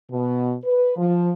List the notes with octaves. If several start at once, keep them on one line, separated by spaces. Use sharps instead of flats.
B2
B4
F3